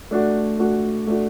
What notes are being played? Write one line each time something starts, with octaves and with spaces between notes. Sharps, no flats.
A3 D4 F#4
A3 D4 F#4
A3 D4 F#4